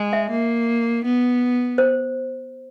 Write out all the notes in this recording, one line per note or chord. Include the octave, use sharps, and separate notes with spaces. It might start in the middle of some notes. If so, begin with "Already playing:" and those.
Already playing: G#3
E5
A#3
B3
C5